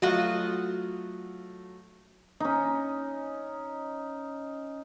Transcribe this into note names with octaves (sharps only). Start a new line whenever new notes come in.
F#3 A3 F4 F#4 D#5
C#4 D#4